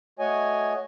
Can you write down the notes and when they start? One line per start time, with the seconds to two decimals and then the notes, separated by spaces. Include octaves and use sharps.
0.19 A3 F#4 C#5 D#5 G#5